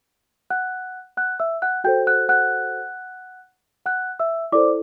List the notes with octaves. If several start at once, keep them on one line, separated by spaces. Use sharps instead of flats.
F#5 F#6
F#5 F#6
E5 E6
F#5 F#6
F#4 A4 C5 G5 G6
F#5 F#6
F#5 F#6
F#5 F#6
E5 E6
E4 A4 C5 D5 D6